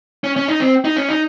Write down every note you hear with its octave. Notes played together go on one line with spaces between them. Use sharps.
C#4
C#4
D#4
C4
D#4
C#4
D#4